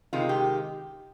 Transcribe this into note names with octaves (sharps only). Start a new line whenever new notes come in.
C3 D#3 G#3 F4
G4